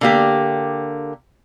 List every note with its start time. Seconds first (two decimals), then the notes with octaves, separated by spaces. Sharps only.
0.01 D3 A#3 G4